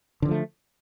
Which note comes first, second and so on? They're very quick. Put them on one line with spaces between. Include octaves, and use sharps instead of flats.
D3 D#3 F3 A3